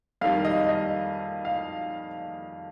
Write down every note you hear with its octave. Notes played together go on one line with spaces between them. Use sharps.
F2 D#3 G3 F5
D#5
D#5
F5